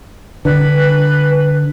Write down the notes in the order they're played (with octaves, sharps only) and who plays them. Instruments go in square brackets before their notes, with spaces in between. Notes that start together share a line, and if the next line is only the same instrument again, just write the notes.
[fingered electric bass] D3 [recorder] B4